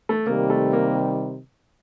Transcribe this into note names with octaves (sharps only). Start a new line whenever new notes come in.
A3
C3 D#3 G3 A#3
A3
A#3